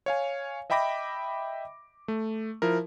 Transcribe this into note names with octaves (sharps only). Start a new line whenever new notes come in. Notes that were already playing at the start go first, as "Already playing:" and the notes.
C#5 F5 G#5
D#5 E5 G5 B5 D6 A#6
A3
F3 E4 A#4